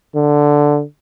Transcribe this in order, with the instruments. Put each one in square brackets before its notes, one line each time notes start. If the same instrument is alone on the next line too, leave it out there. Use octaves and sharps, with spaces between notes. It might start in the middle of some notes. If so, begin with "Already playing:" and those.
[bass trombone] D3